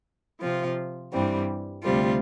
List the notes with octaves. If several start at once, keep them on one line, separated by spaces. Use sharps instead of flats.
C3 F3 C4 F4
G2 E3 G3 C4
D2 C3 G3 C4 F4